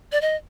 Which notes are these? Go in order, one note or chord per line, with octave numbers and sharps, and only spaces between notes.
D5
D#5